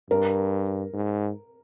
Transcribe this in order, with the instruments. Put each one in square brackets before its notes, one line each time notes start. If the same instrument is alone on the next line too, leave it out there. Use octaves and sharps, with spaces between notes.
[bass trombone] G2 [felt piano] A#4
[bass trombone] G#2